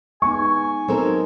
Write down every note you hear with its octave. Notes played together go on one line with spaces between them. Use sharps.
G#3 B3 D#4 G#5 C#6
F#3 B3 C4 D#4 A4 A#4